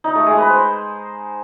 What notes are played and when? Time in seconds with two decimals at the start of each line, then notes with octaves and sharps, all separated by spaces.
0.04 D#4
0.15 A3
0.27 G#3
0.38 B4
0.49 C5